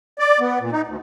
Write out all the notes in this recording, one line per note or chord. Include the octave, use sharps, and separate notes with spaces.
D5
B3
A#2
D#4
D2